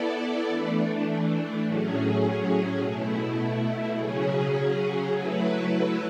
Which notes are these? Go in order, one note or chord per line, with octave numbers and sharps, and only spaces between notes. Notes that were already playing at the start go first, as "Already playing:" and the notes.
Already playing: B3 E4 A4 D5
E3 A3 D4
A2 F#3 C#4 G#4
B2 A3 E4
C#3 F#3 C#4 G#4
F#3 A3 E4 B4